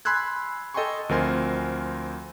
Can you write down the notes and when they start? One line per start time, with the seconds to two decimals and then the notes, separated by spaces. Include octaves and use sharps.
0.05 G#5 B5 C6 E6 F#6 G#6
0.74 A4 D#5 G5 G#5 C6 C#6
1.09 D2 F3 C4 A#4 G#5 C6